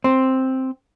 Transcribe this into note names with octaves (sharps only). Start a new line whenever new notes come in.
C4